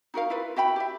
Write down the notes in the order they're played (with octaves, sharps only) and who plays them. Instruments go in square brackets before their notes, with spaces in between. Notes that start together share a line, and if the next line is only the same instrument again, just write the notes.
[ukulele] D#4 F#4 A#4 F5
E4 F4 B4
F#4 E5 G5 B5
G4 E5